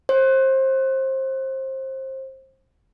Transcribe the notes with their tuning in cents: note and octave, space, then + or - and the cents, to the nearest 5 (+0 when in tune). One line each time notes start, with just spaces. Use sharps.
C5 +25